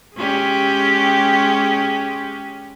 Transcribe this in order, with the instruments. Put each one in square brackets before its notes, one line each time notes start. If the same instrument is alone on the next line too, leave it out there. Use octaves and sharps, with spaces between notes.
[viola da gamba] G#3 C#4 G4